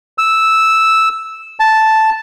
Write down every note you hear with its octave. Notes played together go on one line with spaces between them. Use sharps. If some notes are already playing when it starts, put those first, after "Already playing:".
E6
A5